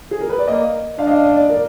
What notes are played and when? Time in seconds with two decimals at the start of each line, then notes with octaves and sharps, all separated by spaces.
0.11 G#4
0.21 A#4
0.30 B4
0.39 D5
0.48 A#3 D#5
0.99 D4 F5
1.07 D#5
1.11 F5
1.24 D#5
1.36 D5
1.49 A#4